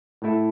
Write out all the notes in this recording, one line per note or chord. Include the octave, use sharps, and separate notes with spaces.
A2 A3 E4 A4